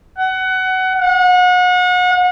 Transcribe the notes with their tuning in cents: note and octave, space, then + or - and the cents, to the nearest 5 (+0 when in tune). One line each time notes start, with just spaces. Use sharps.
F#5 +20
F#5 -35